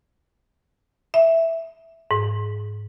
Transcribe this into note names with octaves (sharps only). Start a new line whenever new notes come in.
E5
G#2